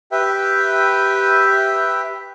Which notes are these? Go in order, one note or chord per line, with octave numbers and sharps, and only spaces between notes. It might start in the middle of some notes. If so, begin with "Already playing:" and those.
G4 B4 E5 G5